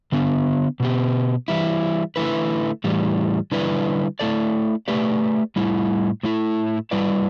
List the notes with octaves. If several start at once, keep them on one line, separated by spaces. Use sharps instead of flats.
D3 B3 D4
B2 B3 G4
E3 G3 E4
D3 A3 E4 B4
A2 E3 G3
D3 G3 E4 B4 D5
A3 E4 A4 D5
A3 G4 B4 D5
A2 G3 E4
A2 A3 E4
G3 E4 B4 D5